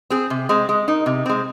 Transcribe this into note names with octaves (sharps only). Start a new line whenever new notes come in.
C4 G#4
C3
G#3 C4
G#3
D#4 A#4
C3
G#3 C4